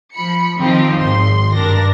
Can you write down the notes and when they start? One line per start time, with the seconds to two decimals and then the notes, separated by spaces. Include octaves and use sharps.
0.14 F3 B5 C#7
0.58 D#3 F3 C4 D#4 F4 G4
0.99 G#1 C6
1.55 G2 D4 A#4 A#6